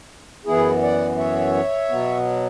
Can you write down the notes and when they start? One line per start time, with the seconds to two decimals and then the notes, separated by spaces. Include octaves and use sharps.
0.46 F#2 E3 B3 E4 G#4
0.82 D5 F#5
1.18 C#5 E5
1.89 B2 F#3 B3